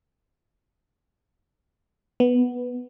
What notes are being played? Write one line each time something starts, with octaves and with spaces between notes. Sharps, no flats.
B3